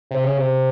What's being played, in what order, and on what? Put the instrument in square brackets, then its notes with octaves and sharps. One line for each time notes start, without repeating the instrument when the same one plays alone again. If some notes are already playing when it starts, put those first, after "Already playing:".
[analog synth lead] C3
C#3
C3